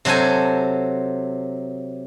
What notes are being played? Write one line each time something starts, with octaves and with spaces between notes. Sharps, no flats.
C3 F#3 A4 C5 G#5